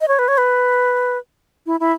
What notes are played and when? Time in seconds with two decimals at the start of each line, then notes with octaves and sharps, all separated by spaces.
0.01 D#5
0.08 C#5
0.19 B4
0.28 C#5
0.38 B4
1.66 E4
1.80 E4